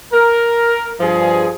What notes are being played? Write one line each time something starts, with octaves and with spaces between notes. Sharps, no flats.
A#4
G2 F3 G#4